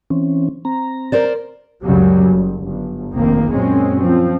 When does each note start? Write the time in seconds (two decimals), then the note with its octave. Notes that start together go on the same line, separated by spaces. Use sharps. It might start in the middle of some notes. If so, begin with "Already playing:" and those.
0.10 E3 C4 C#4
0.65 C4 A#5
1.12 A#4 C5 D5
1.83 C#2 F#2 C#3 F#3 G3
2.31 F#1
2.63 G1
3.14 F1 A#1 D#3 A#3 C4
3.52 F#2 A#2 G#3 C4 C#4
3.99 F3 C4